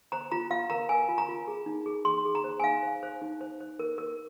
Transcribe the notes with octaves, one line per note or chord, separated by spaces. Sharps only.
C5 A#5
F4 A#5
F4 F5
A#4 A#5
A#4 G#5
F4
A#5
F4
G#4
D#4
G#4
G#4 C6
G#4
A#5
C5
G#5
D#4 F5
C5
C5
D#4
C5
C5
A#4
A#4